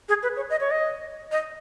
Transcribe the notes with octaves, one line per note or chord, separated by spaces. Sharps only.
G#4
B4
C#5
D#5
C#5
D#5
D#5